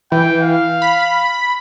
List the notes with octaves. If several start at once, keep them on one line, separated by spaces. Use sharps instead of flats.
E3 G5
F5
B5